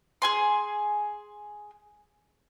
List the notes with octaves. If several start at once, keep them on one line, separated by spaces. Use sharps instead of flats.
G#4 G#5 C6